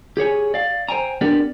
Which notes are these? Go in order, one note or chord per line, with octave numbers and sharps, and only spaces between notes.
G4 G#4 C#5 G#5
D5 F5
C5 G5 G#5 A#5
B3 C4 D4 G4 A#4 D5